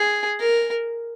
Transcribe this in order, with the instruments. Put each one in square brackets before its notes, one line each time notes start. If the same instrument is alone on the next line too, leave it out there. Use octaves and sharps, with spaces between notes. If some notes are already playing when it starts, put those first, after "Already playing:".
Already playing: [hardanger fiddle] G#4
A#4